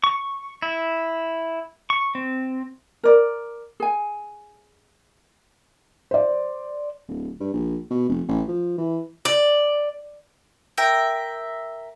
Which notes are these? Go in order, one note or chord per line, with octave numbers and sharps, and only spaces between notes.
C#6
E4
C#6
C4
A#4 D5
G#4 G#5
C5 D5
D1
G2
A#1
B2
F1
A1
F3
E3
D5
A#4 E5 G5